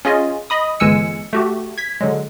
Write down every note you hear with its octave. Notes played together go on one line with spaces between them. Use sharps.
C#4 F4 G#4 D#5 G#5
D#5 B5 D#6
G1 E3 G#3 G#5 E6 C#7
A3 F#4 G4
G#6 B6
D3 F#3 G#3